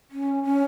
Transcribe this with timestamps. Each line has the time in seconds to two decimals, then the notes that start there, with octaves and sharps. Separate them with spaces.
0.11 C#4
0.44 C#4